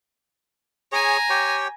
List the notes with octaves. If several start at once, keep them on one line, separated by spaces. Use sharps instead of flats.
G#4 C#5 G#5 A#5
G4 C#5 G5